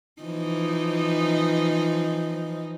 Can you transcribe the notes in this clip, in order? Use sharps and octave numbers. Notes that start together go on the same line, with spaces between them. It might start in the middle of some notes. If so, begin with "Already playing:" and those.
E3 F3 D#4